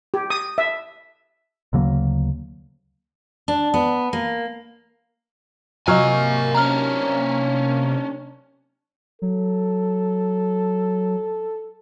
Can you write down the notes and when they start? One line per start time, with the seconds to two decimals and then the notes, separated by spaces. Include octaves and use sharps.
0.14 G4
0.30 D#6
0.58 E5
1.73 D2 C#3 F#3 A#3
3.48 D4
3.74 B3
4.13 A#3
5.88 C3 F#3 A#3 A#4 D#5 G#5 C#6 F6
6.54 C#4 D4 A#5 F6
9.22 F#3 A4